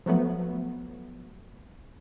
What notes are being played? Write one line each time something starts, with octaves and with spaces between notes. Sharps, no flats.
F3 F#3 A3 B3